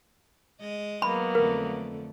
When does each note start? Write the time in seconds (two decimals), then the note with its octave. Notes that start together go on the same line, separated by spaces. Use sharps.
0.60 G#3 D#5
1.02 F#3 A#3 B3 B5
1.35 F2 D3 A3 A#4